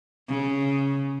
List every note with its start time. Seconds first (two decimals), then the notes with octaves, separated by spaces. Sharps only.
0.29 C#3